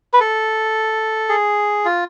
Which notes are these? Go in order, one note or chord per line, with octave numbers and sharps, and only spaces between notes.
B4
A4
G#4
F4